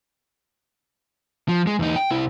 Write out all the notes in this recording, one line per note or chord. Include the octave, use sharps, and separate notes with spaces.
F3
G#3
E2 D#4
G5
C2 E4